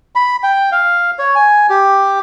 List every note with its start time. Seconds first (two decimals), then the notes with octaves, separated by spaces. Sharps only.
0.15 B5
0.43 G5
0.72 F5
1.19 C#5
1.35 G#5
1.70 G4